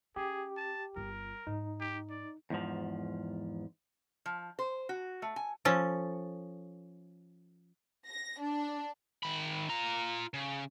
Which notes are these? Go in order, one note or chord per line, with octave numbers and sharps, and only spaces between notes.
C#4 G4 G#4
A5
G1 F4 A#4
G#2 D#4
G4
D5
E2 G#2 F3
F3
C5
F#4
A3
G#5
F3 C#4 A4
A#6
D4
D#3 B5
F4 A#5
C#3